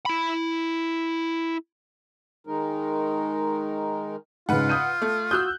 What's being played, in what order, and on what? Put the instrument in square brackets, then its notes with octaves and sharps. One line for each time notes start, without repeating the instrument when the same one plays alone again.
[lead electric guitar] E4 B5
[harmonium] D#3 G#3 D#4 A#4
[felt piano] G#2 C#3 [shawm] F4 [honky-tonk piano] B4 F#5
[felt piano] D#6 G6 D#7
[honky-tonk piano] A3
[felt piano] F#4 D#6 [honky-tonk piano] E6 F#6 G6